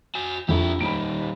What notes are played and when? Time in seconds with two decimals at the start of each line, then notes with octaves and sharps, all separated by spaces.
0.15 F#4 G#5
0.49 A#1 F2 E4 G4
0.81 D#2 A#2 G3 B5 D7